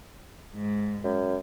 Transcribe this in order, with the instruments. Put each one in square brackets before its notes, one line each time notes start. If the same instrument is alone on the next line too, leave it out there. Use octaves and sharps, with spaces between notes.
[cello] G#2
[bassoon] F#2